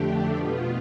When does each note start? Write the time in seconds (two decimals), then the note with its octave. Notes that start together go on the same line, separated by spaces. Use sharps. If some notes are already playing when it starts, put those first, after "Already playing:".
Already playing: F2 D3 A3 D4 G4
0.30 B2 B3 F4